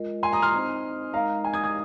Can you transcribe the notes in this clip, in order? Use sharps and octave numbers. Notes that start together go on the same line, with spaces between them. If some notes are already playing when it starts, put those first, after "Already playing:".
Already playing: G#3 F4 A#4 D#5
G#5 C6
A#5 D#6
C6 F6
C4 D#4 C5 D#5
G#3 D#4 A#4 D#5 F5 A#5
G#5
D#6 G#6
D#6 G#6